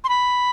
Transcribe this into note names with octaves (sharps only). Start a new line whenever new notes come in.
C6
B5